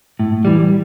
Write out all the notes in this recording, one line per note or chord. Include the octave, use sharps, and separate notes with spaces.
A2
E3 G3